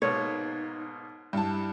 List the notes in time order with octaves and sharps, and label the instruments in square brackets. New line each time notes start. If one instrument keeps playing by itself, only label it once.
[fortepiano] G#2 B2 A#3 [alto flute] D#4 [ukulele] C#5
[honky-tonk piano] G2 A5 [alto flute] E4